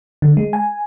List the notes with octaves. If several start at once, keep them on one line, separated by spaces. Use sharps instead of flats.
D3
G#3
G#5